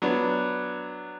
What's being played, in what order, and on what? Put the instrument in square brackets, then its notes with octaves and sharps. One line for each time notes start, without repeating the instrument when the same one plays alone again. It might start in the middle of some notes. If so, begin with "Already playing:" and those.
[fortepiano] F#3 B3 D4